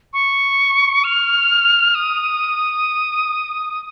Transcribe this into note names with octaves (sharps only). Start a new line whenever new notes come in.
C#6
F6
D#6